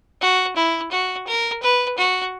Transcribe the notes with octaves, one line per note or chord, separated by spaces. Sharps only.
F#4
E4
F#4
A#4
B4
F#4